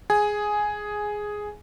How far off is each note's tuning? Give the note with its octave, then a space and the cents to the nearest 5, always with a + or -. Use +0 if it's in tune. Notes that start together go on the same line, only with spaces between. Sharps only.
G#4 +0 G#5 +5